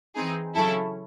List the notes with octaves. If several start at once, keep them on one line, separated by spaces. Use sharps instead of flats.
E3 C4 D#4 G#4
C#3 F#3 C#4 E4 A4